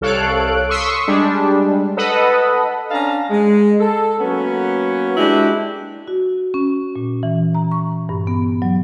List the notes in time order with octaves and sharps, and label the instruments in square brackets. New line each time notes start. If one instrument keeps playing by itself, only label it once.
[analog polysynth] C2 A4 C#5 F5 F#6 D7
C6 C#6 D#6 E6 B6 C7
G3 G#3 D4
A4 B4 D#5 F#5 B5 D#6
[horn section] C#4 D4 F5 A5 A#5
G#3
A4
F#3 A#3 B3 C#4
G#3 D4 E4 F#4 G4
[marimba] F#4
C#4
A#2
E3
A#5
C#6
G2
B3
F#3